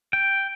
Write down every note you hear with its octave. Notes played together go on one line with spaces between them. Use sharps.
G5